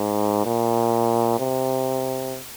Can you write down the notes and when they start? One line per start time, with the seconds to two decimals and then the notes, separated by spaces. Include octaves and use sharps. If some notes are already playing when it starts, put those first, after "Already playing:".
Already playing: G#2
0.45 A#2
1.40 C3